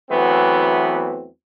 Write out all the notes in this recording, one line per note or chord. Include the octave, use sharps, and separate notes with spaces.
E2 E3 F#3 A3 B3 C4